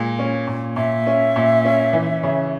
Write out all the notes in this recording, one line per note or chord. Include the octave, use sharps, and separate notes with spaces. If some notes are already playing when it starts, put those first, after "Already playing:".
Already playing: A#2 G#3
C#4
A#2
A#2 E5
C#4
A#2
C#4
E3
C#3